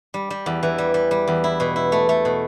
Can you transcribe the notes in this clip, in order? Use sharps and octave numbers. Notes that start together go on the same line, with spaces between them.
G3
G3
E2
E3
G3
G3
G3
E2
E4
B2
E4
A3
A3
B2